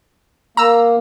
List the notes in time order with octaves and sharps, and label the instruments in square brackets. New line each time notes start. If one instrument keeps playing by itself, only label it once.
[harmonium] A#3 [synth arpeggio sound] A#5 E6